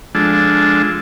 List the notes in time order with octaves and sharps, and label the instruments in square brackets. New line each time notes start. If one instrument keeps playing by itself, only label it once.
[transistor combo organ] F3 G#3 D4 A4 E6